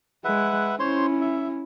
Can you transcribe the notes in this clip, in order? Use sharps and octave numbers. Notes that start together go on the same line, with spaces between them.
G#3 B4 E5 F#5
C#4 E4 C5 C#5 C6
E5